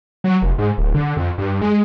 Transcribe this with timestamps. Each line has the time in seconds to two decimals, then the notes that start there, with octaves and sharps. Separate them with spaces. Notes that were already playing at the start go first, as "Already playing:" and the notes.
0.24 F#3
0.42 F1
0.58 G#2
0.78 D1
0.94 D3
1.17 F2
1.38 G2
1.62 G#3